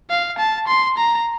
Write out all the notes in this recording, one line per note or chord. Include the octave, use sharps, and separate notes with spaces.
F5
A5
C6
A#5